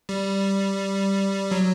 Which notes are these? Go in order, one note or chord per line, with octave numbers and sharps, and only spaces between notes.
G3
F#3